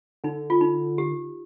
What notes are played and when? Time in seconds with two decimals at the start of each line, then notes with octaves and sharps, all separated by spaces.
0.24 D3 D#4
0.50 F4
0.61 D#4
0.98 G4